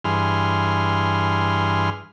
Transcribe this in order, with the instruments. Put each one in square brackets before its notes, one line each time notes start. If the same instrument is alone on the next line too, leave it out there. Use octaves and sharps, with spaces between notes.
[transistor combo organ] G2 E3 G#4 C6 F6